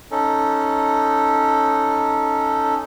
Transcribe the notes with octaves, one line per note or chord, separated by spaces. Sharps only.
C#4 D#4 A4